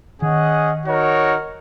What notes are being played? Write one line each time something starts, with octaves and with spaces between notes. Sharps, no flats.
D#3 C#4 G#4 D#5 F#5
D#4 F#4 A#4 C#5